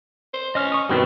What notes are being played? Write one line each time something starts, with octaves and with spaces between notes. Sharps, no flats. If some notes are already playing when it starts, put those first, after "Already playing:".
C5
C#4 D#5 F6
C#6 D#6
G2 B2 D#3 C4 E4